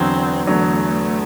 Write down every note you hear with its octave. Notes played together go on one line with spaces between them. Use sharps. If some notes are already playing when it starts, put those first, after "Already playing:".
Already playing: E2 D3 F#3 C4
E2 D3 F#3 A3